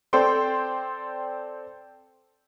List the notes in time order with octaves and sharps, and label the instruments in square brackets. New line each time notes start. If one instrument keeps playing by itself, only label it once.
[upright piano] C4 A4 C5 D5 G5 C6